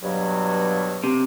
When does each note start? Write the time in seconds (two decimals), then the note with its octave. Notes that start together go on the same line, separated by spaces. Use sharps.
0.02 G2 B2 F#3
1.04 C3